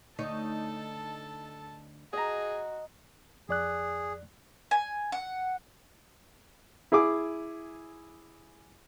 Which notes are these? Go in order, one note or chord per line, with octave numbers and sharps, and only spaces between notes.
D2 D#4 A4 C#5 A5
F#4 G#4 D#5 A#5
F2 G#4 D5 F#6
G#5
F#5
E4 G#4 G#5 D6